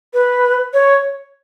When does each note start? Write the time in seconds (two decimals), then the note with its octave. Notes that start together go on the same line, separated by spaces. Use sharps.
0.14 B4
0.73 C#5